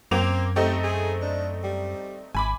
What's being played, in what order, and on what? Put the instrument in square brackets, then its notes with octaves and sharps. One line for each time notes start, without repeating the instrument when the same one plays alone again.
[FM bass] F#2 [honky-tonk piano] A#3 D6 F7 [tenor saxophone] C4
[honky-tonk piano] A3 C4 D#4 [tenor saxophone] G4
[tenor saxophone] G#4
D4
G3
[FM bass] G#1 [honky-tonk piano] G#5 B5 D6